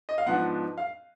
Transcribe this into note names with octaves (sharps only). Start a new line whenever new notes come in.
D#5
F5
G#2 F3 B3 D4 F#5
F5